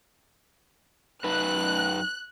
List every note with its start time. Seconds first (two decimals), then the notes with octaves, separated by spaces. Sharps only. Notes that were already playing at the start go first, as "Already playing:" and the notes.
1.24 F#2 D#4 B4 F#6